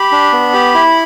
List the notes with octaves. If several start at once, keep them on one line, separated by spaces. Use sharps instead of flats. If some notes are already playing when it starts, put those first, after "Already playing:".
Already playing: G4 B5
D4
B3
G4
E4